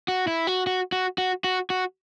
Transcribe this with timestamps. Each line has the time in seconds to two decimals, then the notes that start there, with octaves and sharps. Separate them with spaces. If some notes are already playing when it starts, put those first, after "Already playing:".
0.08 F#4
0.27 E4
0.47 F#4
0.67 F#4
0.92 F#4
1.18 F#4
1.44 F#4
1.70 F#4